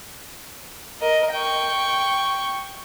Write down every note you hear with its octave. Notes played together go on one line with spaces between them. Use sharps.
A#4 D#5
G5 C#6